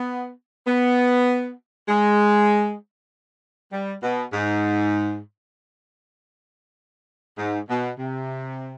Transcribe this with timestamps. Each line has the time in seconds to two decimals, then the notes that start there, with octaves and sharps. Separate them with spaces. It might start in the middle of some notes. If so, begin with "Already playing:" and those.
Already playing: B3
0.67 B3
1.89 G#3
3.72 G3
4.03 B2
4.33 G#2
7.38 G#2
7.69 B2
7.99 C3